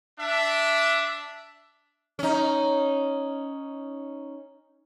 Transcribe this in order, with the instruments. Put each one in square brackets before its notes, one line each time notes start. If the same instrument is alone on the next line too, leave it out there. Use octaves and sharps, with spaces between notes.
[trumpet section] D4 E5
[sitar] C#4 D#4